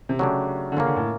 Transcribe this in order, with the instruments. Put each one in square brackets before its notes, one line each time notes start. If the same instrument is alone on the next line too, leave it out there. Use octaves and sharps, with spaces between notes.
[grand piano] C3
[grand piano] C#3 [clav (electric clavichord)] F#3 A3 D4 G4
[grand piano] D3
[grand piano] C#3 [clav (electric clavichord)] A#3 C#4 F4
[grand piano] D3
A2